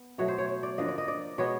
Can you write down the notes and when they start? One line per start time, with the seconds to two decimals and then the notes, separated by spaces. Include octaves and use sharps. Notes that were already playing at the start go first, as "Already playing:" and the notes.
Already playing: B3
0.18 B2 F#3 A3 C#5
0.28 C5
0.38 C#5
0.49 C#5
0.63 D5
0.78 D3 F3 A#3 D#5
0.88 D5
0.98 D#5
1.08 D5
1.38 B2 G#3 B3 C#5